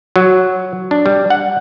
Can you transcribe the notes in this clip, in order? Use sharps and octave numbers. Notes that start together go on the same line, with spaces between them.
F#3
D4
G3
F#5